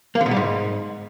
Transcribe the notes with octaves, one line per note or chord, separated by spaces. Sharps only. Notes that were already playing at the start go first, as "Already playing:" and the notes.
A#3
D3
B2
G3
G#2